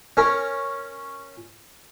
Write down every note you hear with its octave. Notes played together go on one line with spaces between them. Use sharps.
C#4 A#4